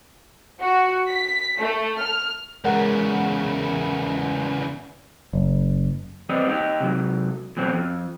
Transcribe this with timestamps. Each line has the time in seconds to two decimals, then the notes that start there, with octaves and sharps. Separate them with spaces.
0.61 F#4
1.09 B6
1.59 A3
2.01 F6
2.64 E2 C#3 G#3 A#4 F#5
5.33 F#1
6.29 G3 C4 B4 D#5
6.48 D#4 G4
6.80 C3 F#3
7.57 B2 F#3 C4
7.74 F2